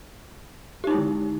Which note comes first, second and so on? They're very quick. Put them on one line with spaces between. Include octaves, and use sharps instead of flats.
G4 D#4 E4 G#3 D3